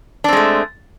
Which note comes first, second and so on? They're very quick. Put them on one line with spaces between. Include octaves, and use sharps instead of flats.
D4 C4 G#3 A3